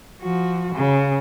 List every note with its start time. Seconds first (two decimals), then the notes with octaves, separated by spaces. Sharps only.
0.22 F3 F#4
0.76 C#3